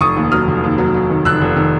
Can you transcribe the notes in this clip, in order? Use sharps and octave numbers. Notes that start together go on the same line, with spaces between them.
F1 C#6 D#6
D#2
F#3 D#6 F6
F1
D#2
F#3
F#3
D#3
F1 E6 F#6
F1
D#3